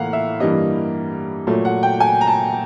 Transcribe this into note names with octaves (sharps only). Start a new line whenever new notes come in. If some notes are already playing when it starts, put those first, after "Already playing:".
Already playing: A2 E3 A#3 F5 F#5
E5
G2 E3 G3 A#3 D#5
A#2 F#3 A3
F#5
G5
G#5
A#5
A5